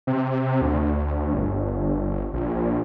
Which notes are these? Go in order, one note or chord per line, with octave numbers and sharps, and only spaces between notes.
C3
D2
G1
A#1